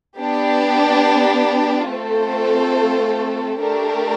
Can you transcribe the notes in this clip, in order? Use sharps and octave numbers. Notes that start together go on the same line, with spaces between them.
B3 D4 G4
A3 C4 F4 A4 C5
A3 D4 G4 A#4